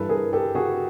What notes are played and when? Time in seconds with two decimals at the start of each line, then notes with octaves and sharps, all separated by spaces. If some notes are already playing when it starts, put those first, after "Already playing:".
Already playing: G2 E3 G3 A4 B4
0.09 G#4 A#4
0.33 G4 A4
0.55 F#4 G#4